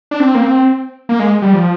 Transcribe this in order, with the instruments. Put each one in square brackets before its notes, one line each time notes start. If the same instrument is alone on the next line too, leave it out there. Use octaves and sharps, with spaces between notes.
[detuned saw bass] D4
C4
A#3
C4
A#3
G#3
G3
F3